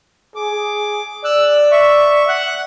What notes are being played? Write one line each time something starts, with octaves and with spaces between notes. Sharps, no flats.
G#4 D6
D5 E6 F#6
E5 C#6
F#5 F#6